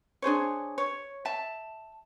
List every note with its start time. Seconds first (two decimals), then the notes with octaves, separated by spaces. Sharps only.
0.22 D4 G#4 C5 C#5
0.78 C#5
1.25 E5 A5